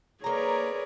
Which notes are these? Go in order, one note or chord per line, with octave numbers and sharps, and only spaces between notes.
A#3 G#4 A#4 B4 C#5 D5 A#5